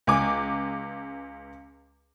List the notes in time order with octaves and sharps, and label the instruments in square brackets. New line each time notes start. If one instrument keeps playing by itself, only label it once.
[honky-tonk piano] C#2 G#5 D6